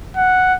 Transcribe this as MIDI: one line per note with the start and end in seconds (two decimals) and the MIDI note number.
0.17 0.55 78